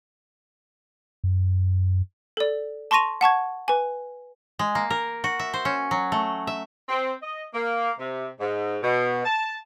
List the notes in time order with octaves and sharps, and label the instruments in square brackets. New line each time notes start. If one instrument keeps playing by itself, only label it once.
[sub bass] F#2
[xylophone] A4 D5
A5 C6 C#6 A#6 D#7 F7
F#5 A5 C#6 G#6
B4 G#5
[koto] G#3
A#3
A#4
F#4
E5
C5
C#4
F#3
A3
E5
[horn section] C4
D#5
A#3
C3
G#2
B2
A5